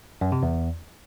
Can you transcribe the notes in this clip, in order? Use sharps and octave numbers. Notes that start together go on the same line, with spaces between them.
F#2
C3
E2